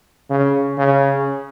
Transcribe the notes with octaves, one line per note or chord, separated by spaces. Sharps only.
C#3
C#3